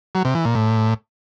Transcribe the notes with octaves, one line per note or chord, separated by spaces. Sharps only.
F#3
C3
E3
A#2
A2